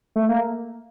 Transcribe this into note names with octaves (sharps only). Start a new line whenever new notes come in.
A3
A#3